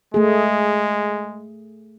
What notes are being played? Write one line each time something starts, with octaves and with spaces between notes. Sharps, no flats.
G#3 A3 G#4